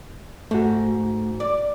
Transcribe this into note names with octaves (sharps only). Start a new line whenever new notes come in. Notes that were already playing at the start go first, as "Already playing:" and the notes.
G#2 A3 F#4
D5